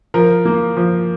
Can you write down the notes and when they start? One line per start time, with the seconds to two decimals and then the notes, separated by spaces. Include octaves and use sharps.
0.14 F3 A#4
0.45 A#3
0.77 F3